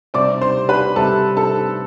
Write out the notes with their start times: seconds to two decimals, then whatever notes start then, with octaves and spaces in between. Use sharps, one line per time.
0.14 C3 G3 C4 D5 D6
0.41 C5 C6
0.69 B4 B5
0.96 C3 G3 C4 A4 A5
1.37 A4 A5